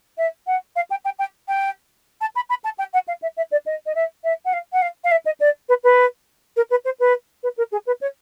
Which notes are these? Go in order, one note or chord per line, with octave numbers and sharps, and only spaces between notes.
E5
F#5
F5
G5
G5
G5
G5
A5
B5
B5
A5
G5
F#5
F5
E5
E5
D5
D#5
D#5
E5
E5
F#5
F5
F#5
F5
F5
E5
D#5
D5
B4
B4
A#4
B4
C5
B4
B4
A#4
G#4
B4
C#5